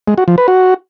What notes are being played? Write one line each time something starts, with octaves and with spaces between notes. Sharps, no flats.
G#3
F#4
F3
B4
F#4